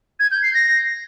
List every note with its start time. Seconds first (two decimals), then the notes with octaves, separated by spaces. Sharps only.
0.20 G#6
0.31 G6
0.43 C7
0.54 A#6